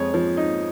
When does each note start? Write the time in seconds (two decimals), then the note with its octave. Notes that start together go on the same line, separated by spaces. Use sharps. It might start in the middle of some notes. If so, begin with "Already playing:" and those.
Already playing: F2 G#3 C#5
0.14 F3
0.37 D#4